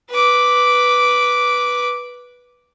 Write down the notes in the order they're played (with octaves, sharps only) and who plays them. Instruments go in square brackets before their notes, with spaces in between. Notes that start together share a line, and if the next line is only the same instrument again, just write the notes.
[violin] B4 D6